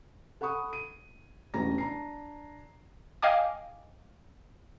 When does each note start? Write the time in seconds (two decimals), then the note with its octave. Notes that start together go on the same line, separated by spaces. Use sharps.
0.41 A4 F#5 B5 C#6 D#6
0.73 D#7
1.54 E1 A1 C#4 D4 A#5 A#6
1.78 D4 A#5 C7
3.22 D#5 F5 G5 G#5 D6